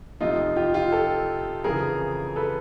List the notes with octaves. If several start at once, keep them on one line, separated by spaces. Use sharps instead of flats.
F2 C3 F3 D#4 F4
F4 G4
F4 G4
G4 A4
F2 C#3 E3 G#4 A#4
A4 B4